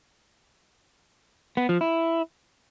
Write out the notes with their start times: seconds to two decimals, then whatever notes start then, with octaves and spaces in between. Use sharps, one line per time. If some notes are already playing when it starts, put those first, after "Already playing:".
1.57 B3
1.69 F3
1.81 E4